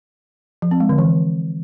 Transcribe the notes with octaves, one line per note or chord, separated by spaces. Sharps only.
F3
C4
G#3
D3
E3